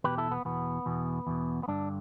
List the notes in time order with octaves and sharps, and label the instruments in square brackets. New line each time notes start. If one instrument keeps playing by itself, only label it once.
[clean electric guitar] E2 B2 G4 B4
E4 A4
B3
E2 B2 B3
E2 B2
E2 B2
B3
G2 D3 D4